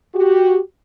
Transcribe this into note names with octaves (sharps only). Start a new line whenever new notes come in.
F#4 G4